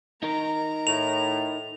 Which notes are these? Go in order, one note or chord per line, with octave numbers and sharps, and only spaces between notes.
D#4 A#4 A#5
A2 F7